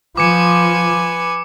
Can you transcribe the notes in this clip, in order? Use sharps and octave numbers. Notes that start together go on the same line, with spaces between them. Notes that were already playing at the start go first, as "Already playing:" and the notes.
F3 B4 G#5 D6 C#7